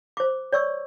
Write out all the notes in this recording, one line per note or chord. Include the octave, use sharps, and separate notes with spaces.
C5 D6
C#5 D5 C#6 E6